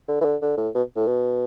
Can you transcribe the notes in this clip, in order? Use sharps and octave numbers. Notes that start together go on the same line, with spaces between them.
D3
E3
D3
D3
A2
B2
A2
B2